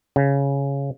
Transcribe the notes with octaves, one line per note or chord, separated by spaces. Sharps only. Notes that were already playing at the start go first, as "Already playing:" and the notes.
C#3